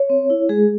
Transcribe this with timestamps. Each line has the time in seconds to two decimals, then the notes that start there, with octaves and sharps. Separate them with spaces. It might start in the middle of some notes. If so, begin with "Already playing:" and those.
Already playing: C#5
0.10 C4
0.30 E4
0.49 G#3 G#4